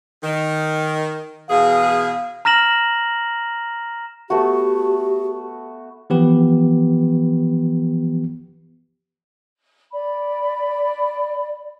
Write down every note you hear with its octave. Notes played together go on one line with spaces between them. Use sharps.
D#3
B2 E3 G#4 F5
A#5 F6 A#6 E7 F#7
A3 B3 F#4 G4
E3 F3 B3 G4 B4
D5 B5